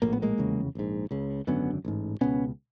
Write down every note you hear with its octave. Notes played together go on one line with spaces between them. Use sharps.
A#1 A2 A#3
B3
G#3 A#3
F1 E2 C#3
A#1 G#2
C#2 C#3
G#1 F#2 D3 B3 C#4
A1 G#2
C#2 B2 B3 C#4